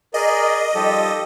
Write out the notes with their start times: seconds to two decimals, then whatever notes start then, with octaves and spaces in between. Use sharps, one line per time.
0.14 G#4 A#4 D5 D#5
0.75 F3 G3 D#4 G4 A4